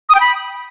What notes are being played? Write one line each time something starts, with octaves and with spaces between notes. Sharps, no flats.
D#6
G5
B5